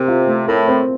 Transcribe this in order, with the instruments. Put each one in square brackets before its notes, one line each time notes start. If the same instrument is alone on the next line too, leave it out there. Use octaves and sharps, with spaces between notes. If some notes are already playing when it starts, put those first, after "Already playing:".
Already playing: [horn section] C3 [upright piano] C4 A#4
[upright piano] F4
A3
[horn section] A2 [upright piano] A#4
[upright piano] C4